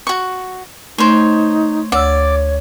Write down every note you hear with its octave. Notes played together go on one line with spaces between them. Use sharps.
F#4 C#6
A3 D#4 C5 C#5
D2 C#5 D5 E6